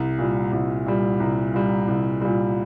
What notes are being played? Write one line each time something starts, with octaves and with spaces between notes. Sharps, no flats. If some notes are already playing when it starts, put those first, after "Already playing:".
Already playing: C2
A#2 G3
C2
A#2 G3
C2
A#2 G3
C2
A#2 G3